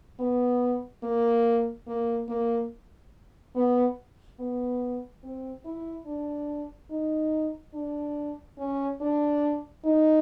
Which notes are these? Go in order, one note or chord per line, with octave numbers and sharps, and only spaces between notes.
B3
A#3
A#3
A#3
B3
B3
C4
E4
D4
D#4
D4
C#4
D4
D#4